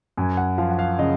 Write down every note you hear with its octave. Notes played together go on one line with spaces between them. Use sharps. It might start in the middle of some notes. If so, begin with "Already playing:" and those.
F#2 G#5
F#5
F3 F5
F#5
F5
C#3 D#5